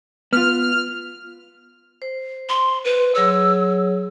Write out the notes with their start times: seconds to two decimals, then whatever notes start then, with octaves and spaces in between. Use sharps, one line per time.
0.33 B3 F4 F6
2.02 C5
2.49 C6
2.85 B4
3.15 F#3 G#4 C#5 E6